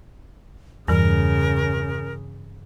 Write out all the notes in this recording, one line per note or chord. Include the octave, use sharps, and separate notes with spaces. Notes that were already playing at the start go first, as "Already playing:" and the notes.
E2 G2 C#3 E3 G3 A#4